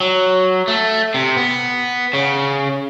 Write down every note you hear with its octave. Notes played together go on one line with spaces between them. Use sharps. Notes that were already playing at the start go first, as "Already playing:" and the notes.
F#3
A3
C3
B3
C#3